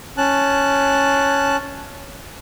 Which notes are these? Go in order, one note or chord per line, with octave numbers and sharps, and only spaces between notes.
C#4 A5 F#6